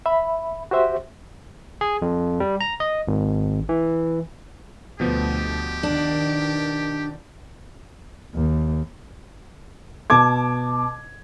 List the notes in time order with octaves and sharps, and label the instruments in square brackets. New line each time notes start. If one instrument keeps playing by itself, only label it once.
[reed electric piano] E5 B5
F#4 G4 C5 E5
[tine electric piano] G#4
F2
G3
A#5
D#5
G#1
E3
[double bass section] D2 [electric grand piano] B2 F3 B3 [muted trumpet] G4
[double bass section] D#3 [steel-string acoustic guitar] D4
[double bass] D#2
[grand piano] B2 A5 D6 G#6